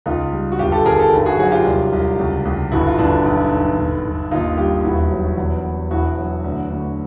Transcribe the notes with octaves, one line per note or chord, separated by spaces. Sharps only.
C#2 D#4 F4
G3
F#4
G1 F4 G4
G4 A4
G1 G#4 A#4
G4 A4
G#1
F#4 G#4
F#3 F#4 G#4
F4 G4
C2
C2
C#2
C#2
G1 E4 F#4
F4
G1 D4 E4
B1
B1
G1
G1
D#2 D#4 F4
G3 F4 G4
E1 E4 F#4
F#3
E2
E2
E1 E4 F#4
F#3
D2
D2